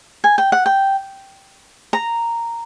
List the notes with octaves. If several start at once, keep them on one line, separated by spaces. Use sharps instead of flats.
G#5
G5
F#5
G5
A#5